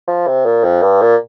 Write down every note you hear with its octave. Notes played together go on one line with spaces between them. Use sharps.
F3
C3
A#2
F2
G2
A#2